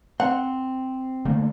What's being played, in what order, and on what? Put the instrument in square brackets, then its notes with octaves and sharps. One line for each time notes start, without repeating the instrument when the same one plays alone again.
[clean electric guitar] C4 [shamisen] F#5
[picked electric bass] D3 A3 A#3